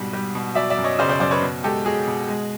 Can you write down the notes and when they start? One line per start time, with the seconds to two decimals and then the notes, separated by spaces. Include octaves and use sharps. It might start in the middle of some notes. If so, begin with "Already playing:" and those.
Already playing: G#2 B2 G3
0.13 G3
0.35 B2
0.55 F#3 D5 E5
0.70 D5 E5
0.77 F#2
0.84 C#5 D#5
0.99 C#3 C5 D5
1.09 C5 D5
1.20 F#2 C5 D5
1.31 B4 C#5
1.42 B2
1.63 G#3 G4 A4
1.85 G#3 F#4 G#4
2.07 B2
2.28 G#3